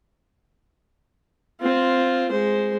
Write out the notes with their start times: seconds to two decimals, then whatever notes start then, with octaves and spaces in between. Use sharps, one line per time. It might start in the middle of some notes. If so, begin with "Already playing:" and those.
1.61 C4 F4
2.31 G#3 C5